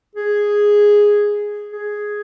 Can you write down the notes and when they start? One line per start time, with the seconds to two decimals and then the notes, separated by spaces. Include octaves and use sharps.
0.16 G#4
1.73 G#4